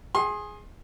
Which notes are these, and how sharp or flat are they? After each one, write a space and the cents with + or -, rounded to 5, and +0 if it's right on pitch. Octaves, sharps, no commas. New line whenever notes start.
G#4 +0 C6 +30